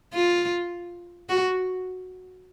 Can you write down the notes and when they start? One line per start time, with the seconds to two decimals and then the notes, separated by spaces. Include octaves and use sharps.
0.14 F4
1.29 F#4